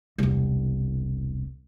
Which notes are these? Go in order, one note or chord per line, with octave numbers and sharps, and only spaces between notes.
E1 C2